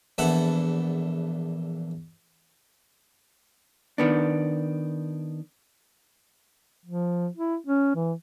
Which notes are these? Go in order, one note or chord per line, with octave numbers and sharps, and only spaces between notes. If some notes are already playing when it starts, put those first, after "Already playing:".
A#1 E2 E4 A4 F#5
D#3 B3 D4
F3
E4
C#4
E3